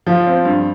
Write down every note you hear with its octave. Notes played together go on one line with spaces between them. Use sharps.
F3
C4
G2